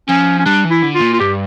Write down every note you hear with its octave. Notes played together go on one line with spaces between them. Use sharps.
F3 C#4
C#4
G3 D4
E3
E4
D3
F4
A#2
F4
G2 G4